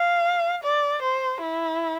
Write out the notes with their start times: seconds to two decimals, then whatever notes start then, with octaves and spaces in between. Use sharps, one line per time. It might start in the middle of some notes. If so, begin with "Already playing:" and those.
Already playing: F5
0.64 D5
1.02 C5
1.42 E4